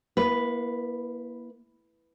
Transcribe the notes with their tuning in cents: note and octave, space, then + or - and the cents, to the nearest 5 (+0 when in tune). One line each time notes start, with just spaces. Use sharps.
A#3 +35 E4 +0 B4 +0